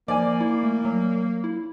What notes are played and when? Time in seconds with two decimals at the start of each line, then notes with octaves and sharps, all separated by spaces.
0.08 F3 A#3 D5 G#5
0.40 E4
0.63 A3
0.85 F#3
1.44 E4